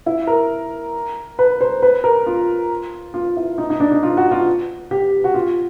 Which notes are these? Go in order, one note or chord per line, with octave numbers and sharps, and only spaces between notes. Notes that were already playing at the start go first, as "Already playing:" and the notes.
E4
A#4
B4
C5
B4
A#4
F4
F4
E4
D#4
D#4
D4
D#4
F4
F#4
F4
G4
F#4
F4